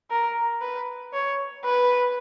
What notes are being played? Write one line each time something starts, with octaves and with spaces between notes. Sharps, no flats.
A#4
B4
C#5
B4